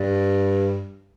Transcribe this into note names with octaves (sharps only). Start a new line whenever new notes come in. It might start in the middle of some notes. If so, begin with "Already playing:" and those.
Already playing: G2